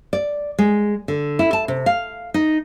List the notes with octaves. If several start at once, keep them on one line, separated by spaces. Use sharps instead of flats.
D5
G#3
D3
E4
A5
C3
F5
D#4